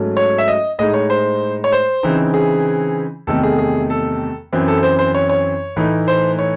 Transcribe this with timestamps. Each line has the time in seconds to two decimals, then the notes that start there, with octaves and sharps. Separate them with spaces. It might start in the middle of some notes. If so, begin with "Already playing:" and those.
Already playing: G#2 F#3 A3 C#4
0.17 C#5
0.38 E5
0.48 D#5
0.79 A2 G#3 D#4 D#5
0.94 C#5
1.10 C5
1.64 C#5
1.72 C5
2.03 C#3 E3 C4 D#4
2.34 G#4
3.27 E2 C3 D#3 A3 A4
3.43 G#4
3.58 G#4
3.90 A4
4.53 F#2 E3 C4
4.68 A4
4.83 C5
4.99 C5
5.15 C#5
5.29 C#5
5.76 A2 E3 A3 D#4
6.08 C5
6.39 C#5